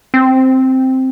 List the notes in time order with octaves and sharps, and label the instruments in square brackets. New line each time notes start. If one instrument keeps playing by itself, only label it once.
[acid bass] C4